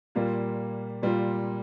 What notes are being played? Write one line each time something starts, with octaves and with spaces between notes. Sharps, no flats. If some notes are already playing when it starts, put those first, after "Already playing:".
A#2 G3 A#3 F4
A#2 G3 A#3 F4